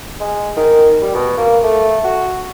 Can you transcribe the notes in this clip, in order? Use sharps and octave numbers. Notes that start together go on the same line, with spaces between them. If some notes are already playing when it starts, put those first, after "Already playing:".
G#3
D#3
G3
B2
A#3
A3
F#4